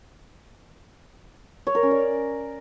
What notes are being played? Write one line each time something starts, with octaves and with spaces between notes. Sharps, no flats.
C#5
A#4
C#4
D5